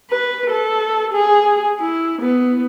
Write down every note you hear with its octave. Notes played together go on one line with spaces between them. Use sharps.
B4
A4
G#4
E4
B3